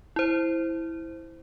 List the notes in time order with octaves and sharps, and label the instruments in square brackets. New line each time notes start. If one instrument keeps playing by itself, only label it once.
[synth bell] E4 C5